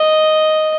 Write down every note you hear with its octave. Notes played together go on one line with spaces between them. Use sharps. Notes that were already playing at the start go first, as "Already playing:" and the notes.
Already playing: D#5